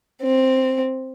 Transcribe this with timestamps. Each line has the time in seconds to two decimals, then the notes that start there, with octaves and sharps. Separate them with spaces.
0.22 C4